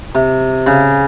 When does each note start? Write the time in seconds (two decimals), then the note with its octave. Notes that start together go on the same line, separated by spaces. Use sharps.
0.15 C3
0.66 C#3